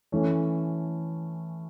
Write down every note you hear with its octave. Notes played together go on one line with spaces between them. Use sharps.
E3 A3 C#4